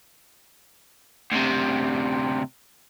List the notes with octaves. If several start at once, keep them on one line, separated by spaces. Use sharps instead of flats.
D2 C3